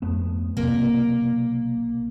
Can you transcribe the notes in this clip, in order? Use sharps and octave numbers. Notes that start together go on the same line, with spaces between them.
F2 A3 B3
B1 C3 A#3